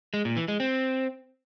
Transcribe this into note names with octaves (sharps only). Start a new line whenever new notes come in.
G#3
A#2
E3
G#3
C4